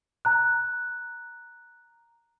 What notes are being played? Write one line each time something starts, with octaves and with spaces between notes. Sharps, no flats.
A#5 F#6